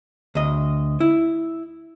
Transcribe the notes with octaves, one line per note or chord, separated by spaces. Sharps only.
D2 D#5
E4